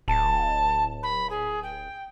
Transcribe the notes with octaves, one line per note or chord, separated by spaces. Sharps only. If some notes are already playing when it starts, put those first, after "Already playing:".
D1 A5
B5
G#4
G5